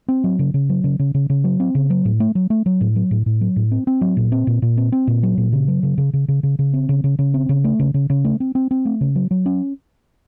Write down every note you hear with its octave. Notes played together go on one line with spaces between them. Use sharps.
C4
F#3
C#3
C#3
F#3
C#3
C#3
C#3
C#3
F#3
C4
C#3
F#3
A2
A3
F#3
A3
F#3
A2
F#3
A2
A2
F#3
A2
C4
C4
F#3
A#2
C4
A#2
A#2
C4
C4
A#2
F#3
A#2
C#3
F#3
C#3
C#3
C#3
C#3
C#3
C#3
C4
C#3
C#3
C#3
C4
C#3
A3
C#3
C#3
C#3
A3
C4
C4
C4
A3
C#3
F#3
F#3
C#4